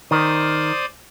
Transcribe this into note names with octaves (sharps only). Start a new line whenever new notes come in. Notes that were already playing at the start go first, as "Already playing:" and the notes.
D#3 C5 D5 D#6